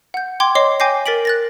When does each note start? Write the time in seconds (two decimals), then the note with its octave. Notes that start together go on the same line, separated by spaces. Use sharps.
0.14 F#5 G6
0.40 G5 C6 D6 G#6
0.55 C#5 D#5 C6 D6 C7
0.80 G5 G#5 D6 G6 A#6 C7
1.06 A#4 A6 B6 D7 F#7
1.25 F#6 A6 A#6